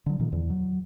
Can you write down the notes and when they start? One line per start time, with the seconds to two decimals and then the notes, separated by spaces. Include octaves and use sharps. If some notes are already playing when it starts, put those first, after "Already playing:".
0.06 D3 F#3
0.20 A#2 D#3 F3
0.32 E2
0.50 F#3